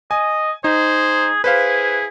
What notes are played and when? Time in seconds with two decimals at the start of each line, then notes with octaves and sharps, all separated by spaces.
0.11 D#5 G#5
0.64 D#4 G#4 C5
1.44 E4 G#4 B4 C5 F5